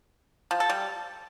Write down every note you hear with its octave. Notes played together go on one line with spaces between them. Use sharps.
F3
A4
G3